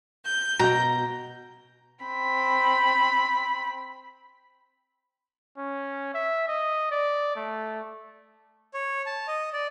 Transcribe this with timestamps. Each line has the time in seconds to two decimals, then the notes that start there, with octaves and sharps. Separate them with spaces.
0.24 G6
0.59 B2 G5 A#5
2.05 C4 B5
5.58 C#4
6.14 E5
6.48 D#5
6.92 D5
7.36 A3
8.74 C#5
9.06 A5
9.27 D#5
9.53 D5